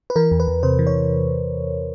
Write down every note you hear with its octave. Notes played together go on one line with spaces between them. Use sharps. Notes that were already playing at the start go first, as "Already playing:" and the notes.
B4
E3 A#4
E2
B4
E2
C3 C5
E3
C#5